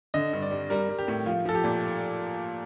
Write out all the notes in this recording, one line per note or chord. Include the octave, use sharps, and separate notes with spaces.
D3 D#5
G2
D5
G3
G3 A#4
G3
G4
A2
F3 F4
F3 A4
G4
A#2